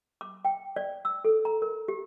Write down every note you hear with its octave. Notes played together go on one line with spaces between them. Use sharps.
D6
G5
D5
E6
A4
A#5
A#4
G4